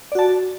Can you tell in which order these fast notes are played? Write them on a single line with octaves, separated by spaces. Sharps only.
D5 F#4 A5